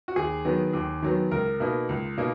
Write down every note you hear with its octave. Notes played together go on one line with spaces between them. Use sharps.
F#4
D#2 G#4
D#3 F#3 B3
D#2
D#3 F#3 B3
C#2 A#4
B2 A#3 D#4
C#2
B2 A#3 D#4